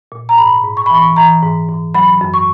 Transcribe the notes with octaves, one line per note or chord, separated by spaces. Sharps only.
A#2
A#5
G#2 B5
G#2
C#6
B5
E3 C#6
E3 A#5
G#2
G#2
F#3 B5
F#2
C#6